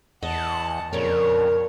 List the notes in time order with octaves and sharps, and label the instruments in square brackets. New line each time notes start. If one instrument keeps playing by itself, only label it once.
[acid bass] E2 [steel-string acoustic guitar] D#5 [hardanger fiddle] F#5 A5
[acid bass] F2 [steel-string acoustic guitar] A#2 C#3 A#4 [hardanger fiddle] C#5